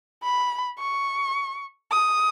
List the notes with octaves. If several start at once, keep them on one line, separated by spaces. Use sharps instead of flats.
B5
C#6
D#6